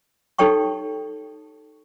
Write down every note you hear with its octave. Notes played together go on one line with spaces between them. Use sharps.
D#4 G4 A4 C#5 G5 C#6